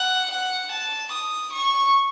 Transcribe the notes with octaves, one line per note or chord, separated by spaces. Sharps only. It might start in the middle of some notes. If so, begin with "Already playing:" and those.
Already playing: F#5
F#5
A5
D#6
C#6